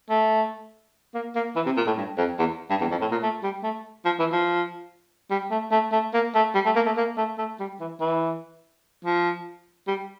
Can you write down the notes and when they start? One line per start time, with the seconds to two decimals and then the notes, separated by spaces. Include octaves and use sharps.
0.10 A3
1.15 A#3
1.35 A#3
1.56 E3
1.66 C3
1.77 A#2
1.87 A2
1.97 G2
2.18 F2
2.39 E2
2.70 G2
2.81 E2
2.91 F2
3.01 A2
3.11 A#2
3.23 A3
3.43 G3
3.63 A3
4.05 F3
4.20 E3
4.33 F3
5.31 G3
5.51 A3
5.72 A3
5.92 A3
6.14 A#3
6.35 A3
6.55 G3
6.66 A3
6.76 A#3
6.86 A3
6.97 A#3
7.17 A3
7.38 A3
7.60 G3
7.80 E3
8.00 E3
9.05 F3
9.88 G3